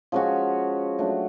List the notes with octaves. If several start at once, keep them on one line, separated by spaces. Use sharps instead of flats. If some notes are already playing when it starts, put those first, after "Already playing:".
F3 G#3 C#4 F#4
F#3 A3 D4